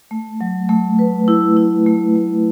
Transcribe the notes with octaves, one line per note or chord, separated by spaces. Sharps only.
A3
F#3
A3
B4
E4
E4
A3
A3